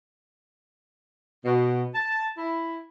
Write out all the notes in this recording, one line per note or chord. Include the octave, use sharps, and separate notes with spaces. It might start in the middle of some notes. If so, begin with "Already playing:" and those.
B2
A5
E4